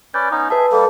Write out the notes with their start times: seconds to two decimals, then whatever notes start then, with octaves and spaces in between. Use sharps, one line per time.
0.14 C#4 B4 D5 G6
0.31 B3 C#4 D#4
0.50 G#4 B4 E5 A5
0.72 G3 A#3 A4